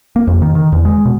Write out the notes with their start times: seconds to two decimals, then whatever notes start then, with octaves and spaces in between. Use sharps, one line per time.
0.16 A#3
0.27 F2
0.42 D#3
0.55 D#3
0.72 E2
0.85 G#3
1.05 B2